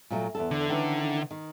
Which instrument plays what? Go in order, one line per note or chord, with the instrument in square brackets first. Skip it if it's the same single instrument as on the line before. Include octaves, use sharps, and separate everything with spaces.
[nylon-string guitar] A#2 F#3 A3
E2 G#2 A4
[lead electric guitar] D3
[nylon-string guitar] D#3 E3 C#4
D#3